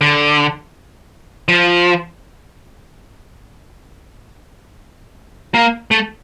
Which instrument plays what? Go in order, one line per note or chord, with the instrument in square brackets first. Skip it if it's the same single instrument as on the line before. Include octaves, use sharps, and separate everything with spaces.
[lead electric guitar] D3
F3
A#3
A3